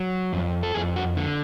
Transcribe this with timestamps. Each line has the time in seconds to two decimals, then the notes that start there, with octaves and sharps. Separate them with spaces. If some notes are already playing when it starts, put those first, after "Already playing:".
Already playing: F#3
0.33 F2
0.63 A4
0.74 F2 G#4
0.96 F#4
1.17 D3